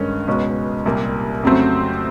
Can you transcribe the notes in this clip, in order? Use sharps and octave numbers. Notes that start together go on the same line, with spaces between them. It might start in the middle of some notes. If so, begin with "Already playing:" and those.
Already playing: G2 D#3 G#3 C#4
C#2 B2 G#3 C#4
C2 A#2 G3 A#3
F2 C#3 F#3 A3 C4